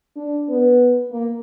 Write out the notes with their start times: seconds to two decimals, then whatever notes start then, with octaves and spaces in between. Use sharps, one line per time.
0.16 D4
0.49 B3
1.12 A#3